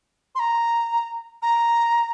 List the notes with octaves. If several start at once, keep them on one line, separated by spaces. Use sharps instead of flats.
C6
A#5
A#5